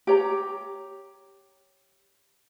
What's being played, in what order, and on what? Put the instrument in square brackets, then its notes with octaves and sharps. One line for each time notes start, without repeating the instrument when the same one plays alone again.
[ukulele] G4 C#5 A#5